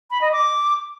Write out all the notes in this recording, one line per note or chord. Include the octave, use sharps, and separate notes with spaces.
B5
D#5
D6